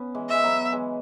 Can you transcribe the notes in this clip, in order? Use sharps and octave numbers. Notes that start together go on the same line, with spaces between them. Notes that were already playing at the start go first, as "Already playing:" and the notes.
Already playing: B3 C#4
E3 G#3
G#3 E5
F#3 B3
E3 G#3